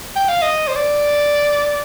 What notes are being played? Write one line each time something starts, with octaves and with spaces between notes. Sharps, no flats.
G5
F5
D#5
C5
D5